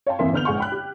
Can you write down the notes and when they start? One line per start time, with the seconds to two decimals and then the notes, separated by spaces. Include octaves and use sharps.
0.07 C#5 F5 G5 A5
0.19 G#1 F2 E3 A#3 E5 C6
0.33 D3 B3 B4 F6 G6 F7
0.45 A#1 G#3 F#5 G#5 C#6
0.58 G5 B5 F#6
0.72 G4